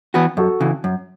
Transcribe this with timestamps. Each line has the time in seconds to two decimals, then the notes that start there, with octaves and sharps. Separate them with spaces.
0.14 E3 B3 F#4 B4
0.37 F#2 F#4 A4
0.60 C#3 E3
0.84 F#2